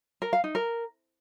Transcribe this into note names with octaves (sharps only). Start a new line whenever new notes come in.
A#4
F5
D#4
A#4